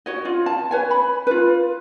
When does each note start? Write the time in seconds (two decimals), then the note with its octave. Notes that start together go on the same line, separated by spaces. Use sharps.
0.06 F#4 C#5 D#5
0.25 F4
0.46 A5
0.71 B4 C#5 G#5
0.91 B5
1.27 F4 B4